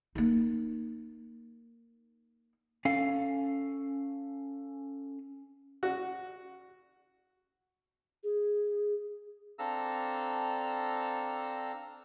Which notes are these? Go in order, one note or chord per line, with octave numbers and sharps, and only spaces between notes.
A#3 D#4
C#4 A4 F5
F#4
G#4
C4 D4 A4 F5 A#5 E6